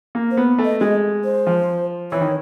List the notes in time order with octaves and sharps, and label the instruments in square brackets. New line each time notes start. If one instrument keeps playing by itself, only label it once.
[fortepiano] A#3
[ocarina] C5
[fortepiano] B3
A3
[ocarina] D#5
[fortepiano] G#3 [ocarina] D#5
[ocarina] C5
[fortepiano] F3
[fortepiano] E3 [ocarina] C#5
[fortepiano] D#3